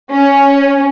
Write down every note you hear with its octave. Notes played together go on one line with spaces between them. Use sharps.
C#4